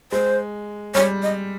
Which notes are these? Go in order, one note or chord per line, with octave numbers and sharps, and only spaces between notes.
G#3 C5
G3 C#5
D#5